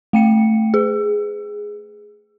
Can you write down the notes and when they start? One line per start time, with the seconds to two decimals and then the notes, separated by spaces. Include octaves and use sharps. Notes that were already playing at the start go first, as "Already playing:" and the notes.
0.13 A3 G5 C#7
0.74 G#4